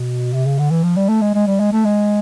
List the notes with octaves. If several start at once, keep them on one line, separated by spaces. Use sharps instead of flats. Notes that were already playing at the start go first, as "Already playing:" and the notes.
Already playing: B2
C3
C#3
D3
E3
F3
G3
A3
G#3
G#3
G3
G#3
A3
G#3